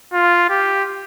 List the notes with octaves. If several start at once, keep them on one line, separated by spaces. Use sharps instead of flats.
F4
G4